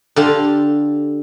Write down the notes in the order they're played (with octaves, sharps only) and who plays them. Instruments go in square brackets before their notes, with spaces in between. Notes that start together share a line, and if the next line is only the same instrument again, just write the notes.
[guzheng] D3 G4 A4 F5 B5 C6